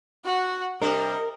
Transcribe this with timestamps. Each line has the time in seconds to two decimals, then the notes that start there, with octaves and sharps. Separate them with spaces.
0.25 F#4 F#5
0.82 C3 G3 D4 A#4 D#5